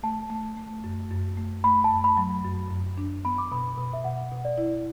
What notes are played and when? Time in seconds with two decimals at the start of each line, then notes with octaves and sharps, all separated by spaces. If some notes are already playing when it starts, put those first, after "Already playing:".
0.03 A3 A5
0.30 A3
0.57 A3
0.84 F#2
1.11 F#2
1.37 A3
1.64 A3 B5
1.84 A5
1.91 F#2
2.04 B5
2.17 F#3
2.45 F#2
2.70 F#2
2.98 D4
3.25 B3 B5
3.38 D6
3.52 B2 B5
3.78 B2
3.93 E5
4.04 B2 F#5
4.32 B2
4.45 D5
4.58 E4